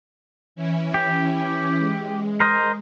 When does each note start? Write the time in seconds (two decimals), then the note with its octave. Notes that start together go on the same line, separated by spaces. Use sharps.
0.56 E3 C#4 E4
0.94 G4
1.78 G#3
2.40 A#4 C5 D#5